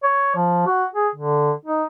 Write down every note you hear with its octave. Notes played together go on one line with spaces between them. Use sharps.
C#5
F3
F#4
G#4
D3
D#4